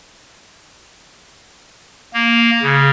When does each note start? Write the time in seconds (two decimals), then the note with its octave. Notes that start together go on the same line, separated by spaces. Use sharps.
2.14 A#3
2.62 C#3